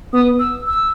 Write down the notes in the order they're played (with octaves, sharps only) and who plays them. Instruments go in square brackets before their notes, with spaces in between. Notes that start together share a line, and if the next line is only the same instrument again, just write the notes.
[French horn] B3 [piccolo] D#6
[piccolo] E6
E6